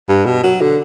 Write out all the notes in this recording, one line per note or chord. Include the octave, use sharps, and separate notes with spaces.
G2
B2
F#3
D3